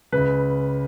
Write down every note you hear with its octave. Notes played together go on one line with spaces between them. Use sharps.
C#3 B4
C#2